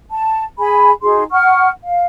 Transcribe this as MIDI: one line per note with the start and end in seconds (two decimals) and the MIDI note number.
0.11 0.44 81
0.58 0.92 68
0.58 0.92 80
0.58 0.92 83
1.02 1.23 63
1.02 1.23 66
1.02 1.23 68
1.02 1.23 84
1.31 1.69 78
1.31 1.69 85
1.31 1.69 89
1.83 2.05 77